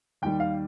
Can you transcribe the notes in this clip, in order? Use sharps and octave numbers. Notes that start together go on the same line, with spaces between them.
D#2 D#3 G3 G5
F5